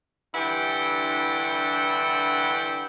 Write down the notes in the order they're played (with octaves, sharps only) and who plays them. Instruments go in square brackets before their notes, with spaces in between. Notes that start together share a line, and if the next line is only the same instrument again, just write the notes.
[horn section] G2 D3 E3 E4 F#5 G5